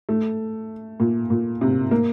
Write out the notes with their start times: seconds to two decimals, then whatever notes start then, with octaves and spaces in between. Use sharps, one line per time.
0.09 A3
1.00 A#2
1.30 A#2
1.61 C3
1.91 A#3